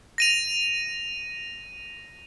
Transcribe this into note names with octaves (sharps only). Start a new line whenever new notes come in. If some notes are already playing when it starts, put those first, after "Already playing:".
A#6 D#7 F7